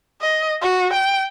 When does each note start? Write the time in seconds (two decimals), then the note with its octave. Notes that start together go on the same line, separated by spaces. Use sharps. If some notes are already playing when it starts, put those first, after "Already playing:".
0.21 D#5
0.61 F#4
0.93 G5